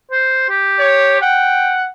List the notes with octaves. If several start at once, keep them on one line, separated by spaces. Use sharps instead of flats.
C5
G4
C#5
F#5 G5